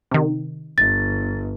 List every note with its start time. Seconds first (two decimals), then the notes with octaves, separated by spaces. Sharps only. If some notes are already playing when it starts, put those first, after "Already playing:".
0.11 C3 D#3
0.78 G1 A6